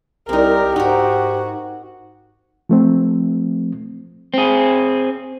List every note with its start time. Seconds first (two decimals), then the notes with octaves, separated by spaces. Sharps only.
0.29 C2 C4 D#4 G4 A#4
0.76 G#2 D#4 F#4 A#4
2.69 F3 A3 C4
4.34 C4 G#4